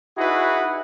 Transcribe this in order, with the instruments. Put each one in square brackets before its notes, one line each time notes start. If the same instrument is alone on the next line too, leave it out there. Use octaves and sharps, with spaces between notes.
[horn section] D#4 E4 F#4 G#4 B4